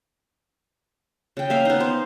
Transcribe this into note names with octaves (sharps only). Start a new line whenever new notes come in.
C#3 G5
A#3 E5 F5
B3 D#4
C5